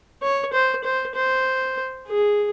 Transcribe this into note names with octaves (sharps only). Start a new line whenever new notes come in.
C#5
C5
C5
C5
G#4